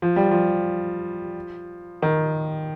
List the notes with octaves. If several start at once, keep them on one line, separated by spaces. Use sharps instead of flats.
F3
G3
F3
D#3